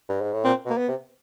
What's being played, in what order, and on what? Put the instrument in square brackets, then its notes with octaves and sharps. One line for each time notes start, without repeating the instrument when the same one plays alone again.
[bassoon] G2
G#2
A2
[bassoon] A#2 [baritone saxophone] C4
[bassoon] B2
[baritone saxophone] A#3
B3
[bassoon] C3